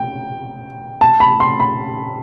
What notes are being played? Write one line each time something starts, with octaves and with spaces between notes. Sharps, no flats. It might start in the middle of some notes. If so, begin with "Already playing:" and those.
Already playing: G5
A5
B5
C6
B5